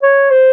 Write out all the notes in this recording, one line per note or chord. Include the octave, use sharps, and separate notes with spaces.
C#5
C5